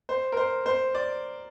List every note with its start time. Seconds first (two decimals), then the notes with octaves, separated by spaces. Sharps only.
0.09 C5
0.32 A#4
0.37 C5
0.66 C5
0.95 D5